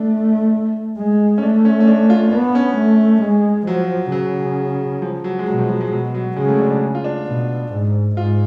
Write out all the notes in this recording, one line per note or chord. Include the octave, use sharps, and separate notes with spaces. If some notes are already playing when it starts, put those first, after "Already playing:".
Already playing: A3 D4
G#3
C#4
A3 D4
C#4
C#4
D4
F4
B3 D4
C#4
A3
G#3
F3 F#3
C#3 F#3
F3
F#3
G#3
B2 F#3
F3
F#3
G#3
B2 F#3
F#3
C#3 G#3
A3
D4
D4
F4
D4
B2
G#2
G#2 F4